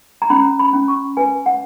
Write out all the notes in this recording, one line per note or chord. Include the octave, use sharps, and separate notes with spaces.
A#5
C#4 B5
B5
C#4
C#6
B4 G#5
F#5